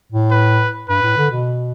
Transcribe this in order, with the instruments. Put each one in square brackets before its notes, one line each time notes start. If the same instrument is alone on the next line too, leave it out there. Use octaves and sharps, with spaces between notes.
[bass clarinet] A2
[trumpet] B4
[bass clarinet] G2 [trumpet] B4
[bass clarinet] A2
D3
B2